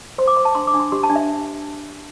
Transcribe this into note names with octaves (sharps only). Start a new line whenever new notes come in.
C5 C6
D6
C5 C6
A5
D4 C6
D6
D4
C6
G4 C6
A5
D4
E5